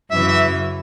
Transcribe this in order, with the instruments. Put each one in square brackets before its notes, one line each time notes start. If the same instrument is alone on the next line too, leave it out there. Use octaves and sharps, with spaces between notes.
[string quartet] F#2 C#3 E3 [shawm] E5
[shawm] E5